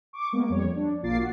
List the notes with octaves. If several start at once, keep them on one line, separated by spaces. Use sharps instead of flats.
C#6 D6
G#3 A#3 B3
F2 G3 C#5
D4
A#1 A#3 F4 D6 A6 C7
F#4